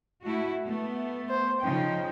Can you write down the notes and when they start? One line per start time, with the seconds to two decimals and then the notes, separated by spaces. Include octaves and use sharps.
0.22 A3 E4 F#4
0.66 A3 B3
1.29 C5
1.61 C#3 F3 D#4 G5